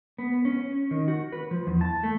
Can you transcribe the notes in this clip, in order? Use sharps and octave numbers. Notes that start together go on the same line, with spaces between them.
B3
C#4
D#3
F#4
B4
F3
E2
A5
A3